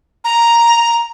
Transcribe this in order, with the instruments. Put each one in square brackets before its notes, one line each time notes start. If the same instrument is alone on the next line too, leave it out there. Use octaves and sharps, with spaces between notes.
[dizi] A#5